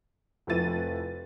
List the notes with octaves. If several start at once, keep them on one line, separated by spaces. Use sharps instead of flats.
F1 F3 E4 B4 A6 D#7